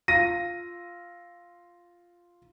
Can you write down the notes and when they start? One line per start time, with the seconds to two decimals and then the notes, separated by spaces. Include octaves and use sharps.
0.08 F4 A#6 D#7